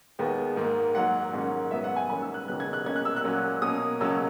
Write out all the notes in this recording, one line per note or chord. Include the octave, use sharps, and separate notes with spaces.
D#2 D#3 G#3 B3
G#2 D#3 A#3
G#2 F#3 A#3 F#5
G#2 D#3 F#3 A#3 C#4
G#2 F#3 B3 E5
F#5
G#5
E2 D#3 A#3 C#4 B5
E6
F#6
D#2 C#3 F#3 B3 F#6
G#6
F#6
B2 A#3 C#4 G#6
F#6
E6
F#6
A#2 F#3 C#4
B2 A#3 C#4 D#6
C#2 B2 F#3 A#3 C#4 E6